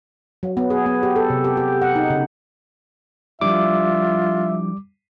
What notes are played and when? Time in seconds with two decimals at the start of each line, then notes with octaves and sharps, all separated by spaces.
0.43 F#3
0.57 B3
0.70 G#4
0.86 B3
1.03 G4
1.16 A4
1.30 C3
1.44 G4
1.57 G4
1.82 F#5
1.96 D#4
2.10 C#3
3.41 F3 G3 D4 E4 F4 E5 D6